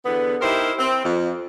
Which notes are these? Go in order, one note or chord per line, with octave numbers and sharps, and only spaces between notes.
E2 D3 B3
D#4 E4 G4 A#4 C5
C4
F2